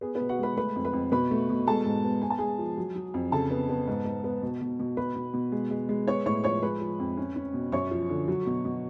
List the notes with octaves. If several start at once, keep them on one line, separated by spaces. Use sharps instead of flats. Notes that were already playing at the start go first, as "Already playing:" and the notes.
B3 G#4
B3 B4
B2
F#4 F#5
G#3 B4 B5
A3 B4 B5
F2
B4 B5
F2
B2 B4 B5
A3
B2
G#3 A4 A5
G#2
B3
B3 G#5
A5
G#3 G#4 G#5
F3
F#3
F#3
F2
C#3 A4 A5
B3
B3
G#2
G#2
B3
B2
B2
B2
B2 B4 B5
B2
B2
G#3
G#3
G#3
B3 C#5 C#6
A2 C#5 C#6
F3 C#5 C#6
G#3 B4 B5
F3
F2
C#4
C#4
B2
F#2 C#5 C#6
F3
D3
F#3
B2
B2